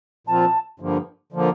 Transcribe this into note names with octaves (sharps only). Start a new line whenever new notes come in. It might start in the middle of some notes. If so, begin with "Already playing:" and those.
A#2 F3 C4 F4 A5
G2 D3 F3 A#3
D3 F3 A#3